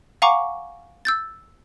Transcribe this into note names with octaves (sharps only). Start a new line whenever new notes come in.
F5 F#5 G#5 A#5 C#6 D6
E6 G6 A6